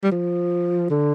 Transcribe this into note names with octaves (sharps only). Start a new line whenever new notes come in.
G3
F3
D3